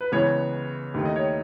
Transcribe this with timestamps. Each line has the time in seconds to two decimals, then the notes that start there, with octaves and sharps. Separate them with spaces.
0.01 B4
0.12 C#2 C#3 E3 G#3 B3 C#5
0.94 D#2 D#3 A3
1.05 D#5
1.16 C#5